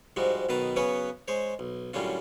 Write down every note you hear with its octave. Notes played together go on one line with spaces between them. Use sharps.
G#2 F3 G3 G#3 F#4
B1 B2 D#3 B4 A5 A#5
C#3 F#3 B3 C#4 B4 C#5
G#3 C5 C#5
B1
F#2 A2 D3 G3 C#4 F4